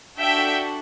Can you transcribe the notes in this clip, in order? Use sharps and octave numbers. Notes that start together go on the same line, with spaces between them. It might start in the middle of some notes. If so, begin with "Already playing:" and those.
D4 F#4 A4 E5 G5